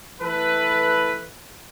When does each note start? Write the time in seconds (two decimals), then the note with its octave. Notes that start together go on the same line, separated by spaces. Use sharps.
0.22 E3 A3 A4 B4